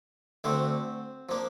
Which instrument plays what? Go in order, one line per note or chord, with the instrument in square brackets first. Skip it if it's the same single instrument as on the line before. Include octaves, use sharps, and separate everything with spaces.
[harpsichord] D2 D3 A3 C4 D4 C5
F3 A#3 D4